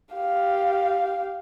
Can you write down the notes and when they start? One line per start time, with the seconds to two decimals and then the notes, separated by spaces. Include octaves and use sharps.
0.15 G4 F5